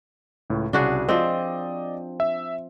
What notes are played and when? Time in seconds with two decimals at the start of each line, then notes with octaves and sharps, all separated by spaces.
0.50 C#2 A2
0.73 C2 C#3 D4 F#4 G#4
1.09 F3 C4 D5 D#5
2.20 E5